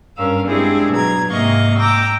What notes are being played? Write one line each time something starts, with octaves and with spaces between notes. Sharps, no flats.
G2 C#4 A#4 F5 E6
G#3 C4 D4 E4 G4 G#4
B2 F#3 A#5 G#6
G#2 C3 A#3 D#5 F5 C#6
G5 A#5 D6 E6